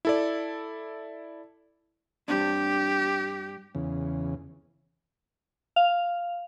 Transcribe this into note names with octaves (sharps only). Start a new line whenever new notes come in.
E4 A4 D5
G2 C4 D4 G4
E2 C#3
F5